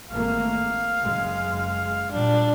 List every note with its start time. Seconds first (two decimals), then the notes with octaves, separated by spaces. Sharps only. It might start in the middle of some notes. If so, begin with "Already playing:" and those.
0.11 G#1 A3 A#3 F5
1.02 F#1 G#3
2.12 A#2 G3 D4